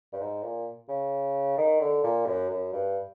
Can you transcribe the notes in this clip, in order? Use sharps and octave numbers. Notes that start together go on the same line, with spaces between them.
G2
G#2
A#2
C#3
D#3
D3
A#2
F#2
F#2
G2